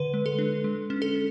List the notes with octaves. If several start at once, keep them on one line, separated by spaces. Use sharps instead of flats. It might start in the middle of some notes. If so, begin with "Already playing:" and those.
Already playing: D3 B4
G#3
A4
D4
G#3
C#4
A4
C#4